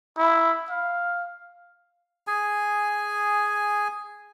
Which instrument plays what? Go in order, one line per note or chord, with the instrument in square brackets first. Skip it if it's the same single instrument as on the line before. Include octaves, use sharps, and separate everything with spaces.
[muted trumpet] E4
F5
[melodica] G#4 G#5